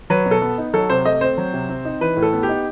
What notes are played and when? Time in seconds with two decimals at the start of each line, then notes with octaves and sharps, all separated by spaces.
0.10 F#3 B4
0.26 B2
0.31 A4
0.42 B3
0.58 D#4
0.73 F#3 A4
0.90 C3 C5
1.05 A3 D#5
1.21 C4 C5
1.37 F#3
1.53 C3
1.70 C4
1.85 D#4
2.01 E3 B4
2.17 A2
2.22 A4
2.33 B3
2.43 G4
2.49 D#4